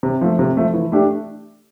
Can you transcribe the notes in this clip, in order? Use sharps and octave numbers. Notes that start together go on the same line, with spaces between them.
C3
F3 A3
C3
F3 A3
E3
A3 D4 G4